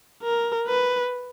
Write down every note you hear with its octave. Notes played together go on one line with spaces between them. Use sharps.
A#4
B4